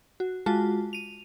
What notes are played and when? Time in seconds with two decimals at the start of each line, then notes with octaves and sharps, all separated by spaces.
0.20 F#4
0.46 G#3 F4 F#4 A5
0.93 D#7 F7